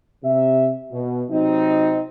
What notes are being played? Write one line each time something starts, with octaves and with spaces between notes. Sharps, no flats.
C3 E5
B2
C3 F#3 C4 D#4